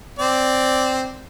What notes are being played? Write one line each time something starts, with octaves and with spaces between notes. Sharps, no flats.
C4 D5